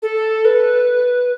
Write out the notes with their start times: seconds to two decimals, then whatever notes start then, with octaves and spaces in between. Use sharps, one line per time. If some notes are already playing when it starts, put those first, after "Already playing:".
0.02 A4
0.45 B4